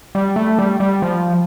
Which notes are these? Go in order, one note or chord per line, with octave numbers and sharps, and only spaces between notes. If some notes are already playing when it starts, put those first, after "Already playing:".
G3
A3
G3
G3
F3